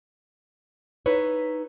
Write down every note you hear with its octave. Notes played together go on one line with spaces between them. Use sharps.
D#4 E4 B4 C#5